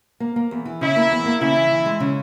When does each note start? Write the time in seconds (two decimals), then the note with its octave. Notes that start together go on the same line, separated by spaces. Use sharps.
0.20 A#3
0.36 A#3
0.51 E2
0.65 E3
0.81 C#3 E4
0.96 A#3
1.11 E2
1.26 A#3
1.40 C#3 E4
1.56 E3
1.71 E3
1.86 G#3
2.00 C#3